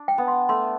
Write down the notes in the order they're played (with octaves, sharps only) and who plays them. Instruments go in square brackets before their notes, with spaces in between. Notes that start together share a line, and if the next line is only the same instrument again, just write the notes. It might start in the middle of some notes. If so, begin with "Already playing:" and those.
Already playing: [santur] D4
[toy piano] G5
[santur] B3
[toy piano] C6
[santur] A3 [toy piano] C6